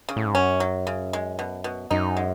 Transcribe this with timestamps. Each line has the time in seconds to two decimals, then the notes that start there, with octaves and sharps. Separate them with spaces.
0.09 C#3
0.16 A2
0.26 G#2
0.34 F#2 C#4
0.60 F#3
0.87 C#3
1.13 G#3
1.39 B2
1.64 B2
1.91 F#2 D#4
2.17 G#3